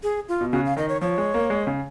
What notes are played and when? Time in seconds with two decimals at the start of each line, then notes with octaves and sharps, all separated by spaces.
0.03 G#4
0.28 F4
0.41 B2
0.52 C#3 F#4
0.65 F5
0.77 D#3 D#5
0.89 C#5
1.01 F3 C#5
1.18 G#3
1.34 A#3
1.50 G#3
1.67 C#3